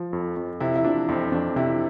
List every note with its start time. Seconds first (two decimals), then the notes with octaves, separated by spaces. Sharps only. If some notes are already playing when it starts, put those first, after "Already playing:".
Already playing: F3
0.13 F2
0.37 F2
0.60 C3 E4
0.76 E4
0.84 F3 D4
1.08 F2 C4
1.32 F2 D4
1.56 C3 E4